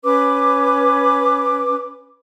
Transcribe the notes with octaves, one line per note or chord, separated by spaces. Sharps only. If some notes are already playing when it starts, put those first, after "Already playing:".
C#4 B4 D6